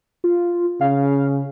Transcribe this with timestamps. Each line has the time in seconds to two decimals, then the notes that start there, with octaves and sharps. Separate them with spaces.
0.24 F4
0.81 C#3 F5